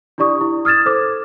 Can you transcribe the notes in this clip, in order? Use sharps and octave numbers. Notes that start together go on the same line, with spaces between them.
D4 E4 G4 D5 C#6 D#6
E4
D#6 F6 G#6 A6 E7
A4 C5 D6